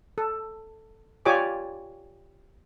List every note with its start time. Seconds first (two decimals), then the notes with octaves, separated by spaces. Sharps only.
0.18 A4
1.26 F4 G4 C#5 D5 G#5 D6